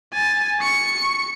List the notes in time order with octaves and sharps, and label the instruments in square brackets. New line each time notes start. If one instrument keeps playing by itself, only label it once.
[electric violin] G#5 A6
C#6 C#7